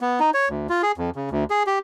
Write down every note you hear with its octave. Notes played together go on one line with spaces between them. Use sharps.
B3
D#4
C#5
D2
F4
G#4
F2
C#3
D2
G#4
G4